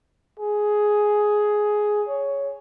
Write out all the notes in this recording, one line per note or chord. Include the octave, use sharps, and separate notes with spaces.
G#4
C#5